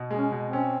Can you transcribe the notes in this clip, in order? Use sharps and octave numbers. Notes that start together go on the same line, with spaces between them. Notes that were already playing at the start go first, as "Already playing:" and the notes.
Already playing: B2
G#3
C#4
B2
C4
C#4